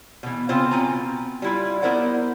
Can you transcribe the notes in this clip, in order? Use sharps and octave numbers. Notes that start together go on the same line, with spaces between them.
B2 E3
C#3 B3 C4 F4 C5
B2 C4 F4 G#5 A#5
G3 E4 F4
B3 E4 A#4 C5 D5 F#5